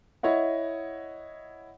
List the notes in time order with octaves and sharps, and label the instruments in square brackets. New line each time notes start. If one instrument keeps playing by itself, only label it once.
[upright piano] E4 C#5 D#5 F#5